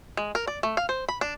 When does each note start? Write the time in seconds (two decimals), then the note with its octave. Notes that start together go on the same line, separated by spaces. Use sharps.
0.17 G#3
0.35 A#4
0.47 D5
0.63 A3
0.77 F5
0.89 C5
1.09 B5
1.21 D4